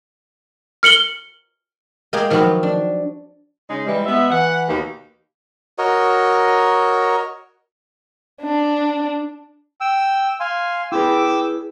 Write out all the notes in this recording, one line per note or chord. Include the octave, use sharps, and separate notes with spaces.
F6 C#7 F#7 G7
G#3 A#3 G4 G#4 G5
D#3 F3 F#3 F#4 G4 B4
D4
C#3 G#3 D#4
E3 G3 G#3
B3 E5
E3 F#5
D#2 B2 A#3
F#4 A#4 C#5 D#5
D4
G5 E6
F5 G#5 C6
E4 G#4 B4 G5 D6 E6